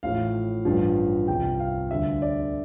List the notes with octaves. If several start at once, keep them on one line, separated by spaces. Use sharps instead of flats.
A1 A2 F3 F5
A1 G2 F3
C2 C3 F3 G5
F5
D2 D3 G3 E5
D5